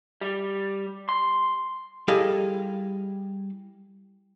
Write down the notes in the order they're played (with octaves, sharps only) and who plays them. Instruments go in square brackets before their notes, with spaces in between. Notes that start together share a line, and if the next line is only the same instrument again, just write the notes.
[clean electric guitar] G3
C6
[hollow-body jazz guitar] G3 E4 G#4 A4 D#5 F5